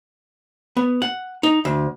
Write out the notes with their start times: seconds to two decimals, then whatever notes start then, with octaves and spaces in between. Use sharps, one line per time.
0.77 B3
1.02 F#5
1.43 D#4
1.65 D2